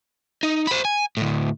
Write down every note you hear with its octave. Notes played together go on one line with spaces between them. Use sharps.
D#4
C5 B5
G#5
D2 A2